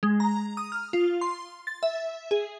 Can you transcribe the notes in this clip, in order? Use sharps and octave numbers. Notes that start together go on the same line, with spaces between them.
G#3
A#5
D#6
F6
F4
C6
A6
E5
G#4